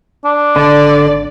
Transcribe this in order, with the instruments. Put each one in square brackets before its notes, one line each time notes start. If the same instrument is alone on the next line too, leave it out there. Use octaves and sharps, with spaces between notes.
[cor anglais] D4
[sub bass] G#1 [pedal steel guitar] D3 [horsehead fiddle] D5